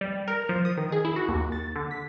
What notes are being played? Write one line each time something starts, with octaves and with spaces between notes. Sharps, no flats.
G3
A#4
F3
D#6
D#3
G#4
E4
F#4
D#2
A6
D3
B6